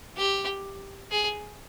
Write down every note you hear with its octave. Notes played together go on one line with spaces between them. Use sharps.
G4
G#4